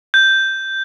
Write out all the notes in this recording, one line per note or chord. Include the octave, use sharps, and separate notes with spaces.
G6